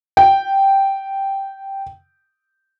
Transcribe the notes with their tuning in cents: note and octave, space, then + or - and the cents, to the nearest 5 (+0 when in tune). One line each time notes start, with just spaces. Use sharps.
G5 -5